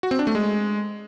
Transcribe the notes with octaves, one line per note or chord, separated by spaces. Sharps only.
F#4
C4
D4
A3
G#3